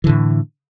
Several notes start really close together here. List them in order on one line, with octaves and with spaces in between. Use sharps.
E3 D3 A2